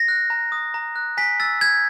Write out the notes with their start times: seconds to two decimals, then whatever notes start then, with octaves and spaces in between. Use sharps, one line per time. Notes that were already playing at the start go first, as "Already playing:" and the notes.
Already playing: A#6
0.08 F#6
0.30 A#5
0.52 D#6
0.74 A#5
0.96 F#6
1.17 G#5 B6
1.40 E6 A6
1.61 G6 G#6